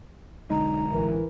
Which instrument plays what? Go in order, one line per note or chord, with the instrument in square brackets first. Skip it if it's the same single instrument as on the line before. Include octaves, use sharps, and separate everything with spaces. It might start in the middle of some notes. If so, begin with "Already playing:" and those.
[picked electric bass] B1 D3 G#3 [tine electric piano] D#4 [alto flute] A#5
[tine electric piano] A1 [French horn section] E3 A#4